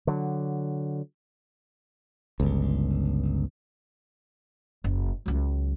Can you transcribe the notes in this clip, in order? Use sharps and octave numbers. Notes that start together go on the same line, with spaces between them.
D3 F#3
G1 C#2
F#1
C#2 F#3